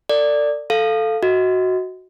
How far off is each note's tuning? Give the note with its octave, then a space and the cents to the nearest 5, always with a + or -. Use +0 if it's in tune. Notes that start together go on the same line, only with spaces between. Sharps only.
A4 +45 D5 +0
A4 +0 F5 -5
F#4 +0 D#5 +30